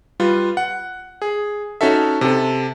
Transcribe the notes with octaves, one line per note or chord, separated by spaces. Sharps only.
G3 F4 B4
F#5
G#4
C#4 D#4 F#4 A4 E5
C3 A4